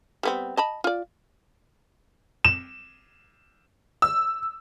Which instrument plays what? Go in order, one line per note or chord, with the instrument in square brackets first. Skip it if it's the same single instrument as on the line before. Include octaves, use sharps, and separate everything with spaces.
[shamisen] G3 B3 C4
D#5 A5 B5
F4 D5
[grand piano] E7
[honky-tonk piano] E6